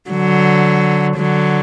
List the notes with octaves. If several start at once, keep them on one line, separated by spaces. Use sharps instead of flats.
D3 F#3
D3 F#3